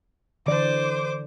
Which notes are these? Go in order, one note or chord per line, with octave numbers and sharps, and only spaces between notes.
D3 E3 C5 D5 D6